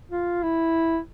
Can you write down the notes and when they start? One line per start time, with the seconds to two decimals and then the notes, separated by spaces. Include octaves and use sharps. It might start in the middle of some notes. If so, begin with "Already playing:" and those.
0.11 F4
0.43 E4